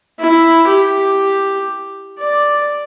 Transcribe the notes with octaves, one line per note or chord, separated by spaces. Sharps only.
E4
G4
D5